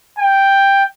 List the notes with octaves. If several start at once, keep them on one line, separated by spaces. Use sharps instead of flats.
G5